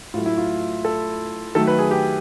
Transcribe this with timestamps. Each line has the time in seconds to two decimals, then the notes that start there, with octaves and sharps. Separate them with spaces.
0.14 A2 F#3 A3 F4
0.26 E4
0.38 F4
0.85 A4
1.55 D#3 F#3 A3 A4
1.67 B4
1.79 G#4
1.91 G4